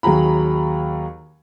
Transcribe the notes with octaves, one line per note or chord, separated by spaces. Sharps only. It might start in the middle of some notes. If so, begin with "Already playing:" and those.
D#2 F#3 G#4 A#5 B5